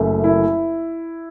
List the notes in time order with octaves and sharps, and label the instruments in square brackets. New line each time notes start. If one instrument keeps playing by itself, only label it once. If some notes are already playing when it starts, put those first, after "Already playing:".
Already playing: [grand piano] F#1 F#2 C#3 A3
E4